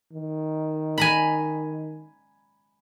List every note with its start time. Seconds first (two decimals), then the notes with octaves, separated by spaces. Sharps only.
0.13 D#3
0.98 G#5 A#5 B5